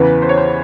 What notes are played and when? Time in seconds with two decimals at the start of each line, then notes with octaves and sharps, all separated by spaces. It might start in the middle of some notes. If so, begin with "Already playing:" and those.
Already playing: E2 C#3 E3 B4
0.22 C5
0.29 C#5
0.38 C5